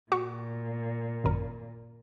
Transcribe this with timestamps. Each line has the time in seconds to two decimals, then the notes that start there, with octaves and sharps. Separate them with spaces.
0.12 A#2 F#4 C#6
1.24 G#1 F#2 A#4